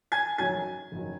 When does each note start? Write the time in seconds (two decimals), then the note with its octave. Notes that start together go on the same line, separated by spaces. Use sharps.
0.12 G#5 G#6
0.38 F#1 F#2 D#3 F#3 G#5 G#6
0.92 F#1 D#3 F#3